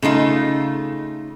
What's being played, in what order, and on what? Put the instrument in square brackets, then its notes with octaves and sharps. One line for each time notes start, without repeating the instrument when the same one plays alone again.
[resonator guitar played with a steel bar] C#3 A3 D#4 F4